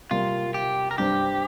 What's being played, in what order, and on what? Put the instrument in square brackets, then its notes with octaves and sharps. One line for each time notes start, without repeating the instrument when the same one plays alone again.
[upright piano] C3 G3 A#3 [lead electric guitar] F4
[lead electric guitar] G4
A#4
[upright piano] G2 G3 C4 [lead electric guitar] G4